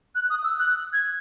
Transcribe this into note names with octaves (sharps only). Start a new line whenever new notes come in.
F#6
D#6
E6
F#6
G#6